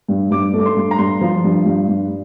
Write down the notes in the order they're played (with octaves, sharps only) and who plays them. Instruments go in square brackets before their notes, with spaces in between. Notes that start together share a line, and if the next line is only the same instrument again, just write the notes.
[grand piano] G2
G2 D6
A3
D6
C6
G2
A#5
G2 C6
F3
G2
G2
G2